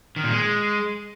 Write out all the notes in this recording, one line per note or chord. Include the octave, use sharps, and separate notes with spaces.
D#3
A#2
G#3